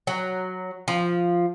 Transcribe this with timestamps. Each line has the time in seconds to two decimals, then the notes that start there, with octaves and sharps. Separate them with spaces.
0.07 F#3
0.88 F3